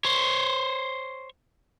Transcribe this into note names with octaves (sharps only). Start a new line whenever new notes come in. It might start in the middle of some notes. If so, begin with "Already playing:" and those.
C5 C#5